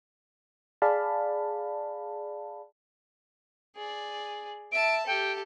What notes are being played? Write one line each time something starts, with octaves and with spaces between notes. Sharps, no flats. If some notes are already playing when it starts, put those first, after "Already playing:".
G#4 D5 F5 A5 B5
G#4 D5
E5 A5 D7
G4 A4 G5